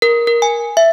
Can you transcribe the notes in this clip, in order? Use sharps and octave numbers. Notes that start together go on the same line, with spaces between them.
A#4
A#4
G#5
E5